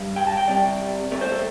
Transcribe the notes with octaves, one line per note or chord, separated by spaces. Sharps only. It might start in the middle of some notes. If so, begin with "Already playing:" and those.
Already playing: G2 G3
G5
A5
G5
C2 C3 G3 D5
C2 C3 A3 D5
C5
A4